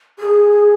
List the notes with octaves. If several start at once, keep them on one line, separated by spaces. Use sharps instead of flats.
G#4